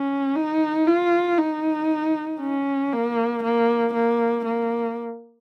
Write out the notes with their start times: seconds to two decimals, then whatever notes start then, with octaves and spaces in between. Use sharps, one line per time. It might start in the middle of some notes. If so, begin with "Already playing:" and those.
Already playing: C#4
0.36 D#4
0.87 F4
1.39 D#4
2.40 C#4
2.92 A#3
3.43 A#3
3.94 A#3
4.45 A#3